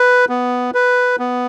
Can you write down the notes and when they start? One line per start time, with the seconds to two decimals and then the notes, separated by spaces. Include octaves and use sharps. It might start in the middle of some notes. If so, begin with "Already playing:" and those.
Already playing: B4
0.29 B3
0.74 B4
1.19 B3